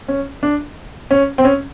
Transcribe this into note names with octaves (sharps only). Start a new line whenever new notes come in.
C#4
D4
C#4
C4
C#4